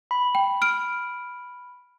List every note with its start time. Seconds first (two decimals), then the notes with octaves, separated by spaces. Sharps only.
0.11 B5
0.35 G5
0.62 F6 D7